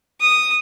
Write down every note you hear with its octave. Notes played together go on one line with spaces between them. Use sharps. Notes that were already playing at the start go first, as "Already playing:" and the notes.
D#6